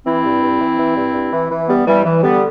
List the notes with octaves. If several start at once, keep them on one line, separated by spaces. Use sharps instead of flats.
E3 C4 E4
G2
G2
E3
E3
G2
G2
E3
E3
G2 G3 B3
G2 E3 G3
E3
D3 G3 B3